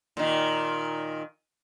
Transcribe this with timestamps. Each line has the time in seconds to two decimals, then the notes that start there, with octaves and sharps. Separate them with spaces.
0.17 A#2 D#3